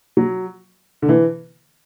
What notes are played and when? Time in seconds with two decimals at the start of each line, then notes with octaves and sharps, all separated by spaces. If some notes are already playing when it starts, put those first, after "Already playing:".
0.17 F#3
1.02 D3
1.09 E3